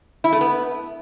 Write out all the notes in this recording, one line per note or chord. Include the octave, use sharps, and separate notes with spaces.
E4
A3
B3